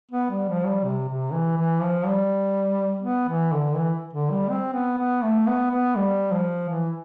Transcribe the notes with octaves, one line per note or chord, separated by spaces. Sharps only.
B3
G3
F3
G3
C3
C3
E3
E3
F3
G3
B3
E3
D3
E3
D3
G3
C4
B3
B3
A3
B3
B3
G3
F3
E3